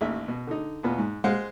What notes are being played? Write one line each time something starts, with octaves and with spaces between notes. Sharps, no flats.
A1 D#2 D#3 E5
B2
D3 D#4
E2 B2 B3 F4
G#2
G#3 C5 F5 F#5